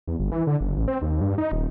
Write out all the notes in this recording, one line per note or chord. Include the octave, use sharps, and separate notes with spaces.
E2
G1
E3
D3
F#1
A1
C4
D#2
G2
D#4
D#1